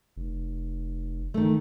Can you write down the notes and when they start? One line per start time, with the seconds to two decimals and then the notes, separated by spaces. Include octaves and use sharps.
0.17 F1
1.34 D#3 A3